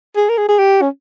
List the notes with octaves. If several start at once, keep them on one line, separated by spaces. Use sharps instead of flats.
G#4
A#4
G#4
G#4
G4
C#4